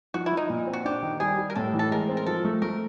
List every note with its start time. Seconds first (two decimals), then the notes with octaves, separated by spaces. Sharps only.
0.14 F3 F#4
0.26 E4
0.32 F3
0.37 D#4
0.50 A#2
0.67 C4
0.73 F#4
0.85 D4 G4
1.02 D#3
1.20 G3 G#4
1.38 G3
1.50 A#4
1.55 A2 A4
1.74 E3
1.79 A4
1.91 G#3 A#4
2.09 C4
2.17 A#4
2.27 F3 A4
2.45 A3
2.62 A3 A#4